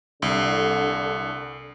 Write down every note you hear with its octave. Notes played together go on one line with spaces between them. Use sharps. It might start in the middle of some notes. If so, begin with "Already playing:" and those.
C2 D3